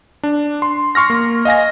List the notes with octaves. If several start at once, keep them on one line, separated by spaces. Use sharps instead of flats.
D4
C6
C6 C#6 F6 A#6
A#3
D#5 F5 G#5 A#6